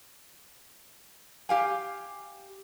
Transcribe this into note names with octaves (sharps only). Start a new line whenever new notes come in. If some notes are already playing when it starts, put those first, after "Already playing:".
G4 F5 G#5